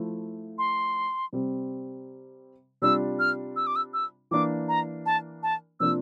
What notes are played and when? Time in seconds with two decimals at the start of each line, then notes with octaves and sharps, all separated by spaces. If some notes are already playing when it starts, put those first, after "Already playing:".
Already playing: F3 A3 E4
0.58 C6
1.33 C3 G3 C4
2.82 C3 G3 D4 F4 E6
3.19 F6
3.56 E6
3.67 D6
3.76 E6
3.94 E6
4.31 E3 A#3 D4 D6
4.68 A#5
5.06 A5
5.43 A5
5.80 C3 F3 A#3 D4 F4 E6